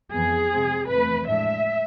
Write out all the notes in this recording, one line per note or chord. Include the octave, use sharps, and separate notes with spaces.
F2 E3 B3 G#4
C3 G#3 C4
E2 C3 F3 A3 B4
A2 G#3 D4 E5